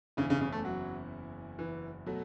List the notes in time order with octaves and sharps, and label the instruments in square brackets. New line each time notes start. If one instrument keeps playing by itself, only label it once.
[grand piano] F#1 E2 E3 C#4 E4 [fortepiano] C#3
[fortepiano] C#3
C#3
A3
F#3
E3
[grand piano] B2 F#3 A3